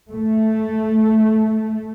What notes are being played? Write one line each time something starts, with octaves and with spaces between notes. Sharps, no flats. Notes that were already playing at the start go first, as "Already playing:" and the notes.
A3